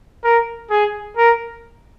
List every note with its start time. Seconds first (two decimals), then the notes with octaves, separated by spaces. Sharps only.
0.24 A#4
0.70 G#4
1.17 A#4